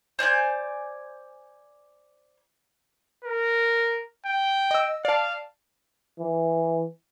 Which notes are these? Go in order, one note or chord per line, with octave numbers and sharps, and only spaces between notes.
C5 D5 G#5 G6
A#4
G5
D#5 E6
D5 F5 A5
E3